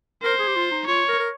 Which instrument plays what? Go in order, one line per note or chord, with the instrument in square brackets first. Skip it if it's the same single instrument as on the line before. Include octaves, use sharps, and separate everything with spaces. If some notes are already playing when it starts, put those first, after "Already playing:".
[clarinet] A#4 [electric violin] C5
[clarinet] G#4
G4
F4
D#4
[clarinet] F4 [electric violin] C#5
[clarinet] A#4
A#4